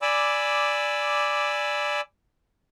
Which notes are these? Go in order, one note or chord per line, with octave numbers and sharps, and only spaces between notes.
D5 G#5 B5 D6 E6